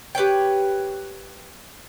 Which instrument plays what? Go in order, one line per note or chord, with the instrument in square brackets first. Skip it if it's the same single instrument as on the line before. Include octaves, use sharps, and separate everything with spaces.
[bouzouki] G4 B4 C#5 G5